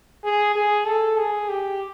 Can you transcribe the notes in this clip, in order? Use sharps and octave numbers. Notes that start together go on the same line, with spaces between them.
G#4
G#4
A4
G#4
G4